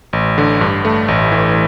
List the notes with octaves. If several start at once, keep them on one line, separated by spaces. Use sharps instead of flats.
A1
D3
G2
A3
A1
E3